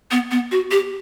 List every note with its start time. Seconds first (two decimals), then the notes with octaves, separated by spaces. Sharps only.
0.11 B3
0.31 B3
0.52 F#4
0.71 G4